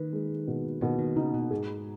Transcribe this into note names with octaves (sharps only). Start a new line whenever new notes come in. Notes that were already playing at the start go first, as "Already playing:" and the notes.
Already playing: D#3 B4
G#3
B2
B2 D#3
D#3
C#3 D#4
B2
G#2 G#4